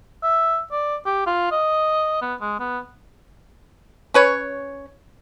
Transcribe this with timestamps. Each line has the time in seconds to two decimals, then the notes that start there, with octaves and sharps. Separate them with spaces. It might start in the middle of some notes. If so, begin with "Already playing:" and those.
0.23 E5
0.72 D5
1.06 G4
1.27 F4
1.52 D#5
2.22 B3
2.41 G#3
2.60 B3
4.14 C#4 B4 C#5